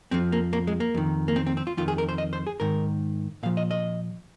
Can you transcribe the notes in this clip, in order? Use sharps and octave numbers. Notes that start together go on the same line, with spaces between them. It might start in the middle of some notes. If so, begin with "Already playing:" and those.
F2 F3 C4
A#3
A#3
G#3
A#3
F2 D#3
A#3
C4
C4
C4
F4
F2 D#3 F4
G#4
A#4
C5
D#5
C5
G#4
G#2 D#3 A#4
A#2 F3 F5
D#5
D#5